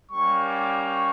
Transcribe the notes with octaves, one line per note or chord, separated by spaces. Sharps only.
G3 A#3 C#4 C#6
D6
C#6